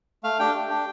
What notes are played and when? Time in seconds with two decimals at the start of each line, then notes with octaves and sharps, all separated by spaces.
0.24 A3 F5
0.39 D4 G4 G5
0.54 A3
0.70 D4 G4